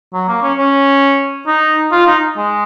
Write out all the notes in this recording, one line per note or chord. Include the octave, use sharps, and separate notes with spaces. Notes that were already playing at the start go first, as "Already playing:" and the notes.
F#3
A#3
C#4
C#4
D#4
F4
D#4
G#3